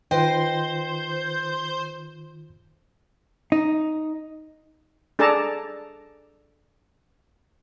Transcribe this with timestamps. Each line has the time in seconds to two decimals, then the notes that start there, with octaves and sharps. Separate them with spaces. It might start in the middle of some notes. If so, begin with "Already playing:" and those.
0.11 D#3 F4 B4 C5 D#5 G5
3.52 D#4
5.19 D4 G#4 A4 D5 A5 A#5